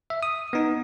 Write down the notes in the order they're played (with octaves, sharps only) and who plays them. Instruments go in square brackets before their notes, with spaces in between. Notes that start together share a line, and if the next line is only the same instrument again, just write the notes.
[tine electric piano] E5
D#6
B3 D#4